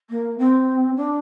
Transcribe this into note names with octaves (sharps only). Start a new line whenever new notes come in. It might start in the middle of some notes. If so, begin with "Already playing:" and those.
A#3
C4
D4